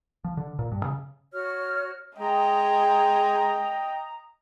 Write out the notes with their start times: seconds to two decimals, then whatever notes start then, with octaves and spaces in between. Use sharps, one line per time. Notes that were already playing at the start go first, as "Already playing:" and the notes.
0.24 F3
0.37 D3
0.59 A#2
0.72 G2
0.84 C#3
1.33 F#4 C#5 F6
2.18 G#3 D#5 G5 A#5 D#6